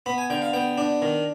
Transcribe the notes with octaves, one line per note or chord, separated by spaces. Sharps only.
B3 B5
G#5
D3 G5
F5
B3 G5
D4
D#3